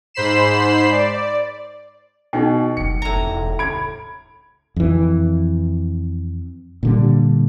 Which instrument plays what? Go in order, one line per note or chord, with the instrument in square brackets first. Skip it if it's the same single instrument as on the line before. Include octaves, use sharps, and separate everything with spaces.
[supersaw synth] G#2 C5 B5 C7 E7
D5
[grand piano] B2 [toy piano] D#4 G5
[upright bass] F#1 F#2 [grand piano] C#7
[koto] A2 A#5
[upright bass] E1
[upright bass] C#2 [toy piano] B5 [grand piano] G#6 D7
[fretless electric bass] F2 E3
A#2 D3 G3